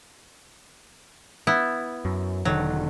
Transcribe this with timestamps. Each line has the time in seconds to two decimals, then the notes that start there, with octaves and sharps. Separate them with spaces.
1.47 B3 E4
2.05 F#2
2.45 E1 D3 D#3 F#3